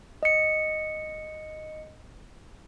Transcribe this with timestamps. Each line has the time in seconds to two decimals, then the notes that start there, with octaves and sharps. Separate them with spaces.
0.23 D#5 C#7